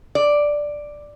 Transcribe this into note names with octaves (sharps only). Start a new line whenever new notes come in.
D5